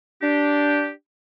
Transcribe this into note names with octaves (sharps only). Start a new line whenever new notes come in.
D4 G4